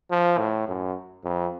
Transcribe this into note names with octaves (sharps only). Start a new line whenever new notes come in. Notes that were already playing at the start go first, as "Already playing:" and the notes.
F3
A2
F#2
F2